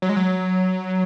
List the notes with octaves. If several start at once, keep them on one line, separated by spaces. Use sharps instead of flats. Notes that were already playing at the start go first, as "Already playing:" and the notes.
F#3
G#3
F#3